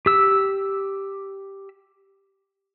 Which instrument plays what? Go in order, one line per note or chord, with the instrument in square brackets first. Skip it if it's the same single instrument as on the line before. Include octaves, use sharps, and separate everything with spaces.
[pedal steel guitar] G4 E6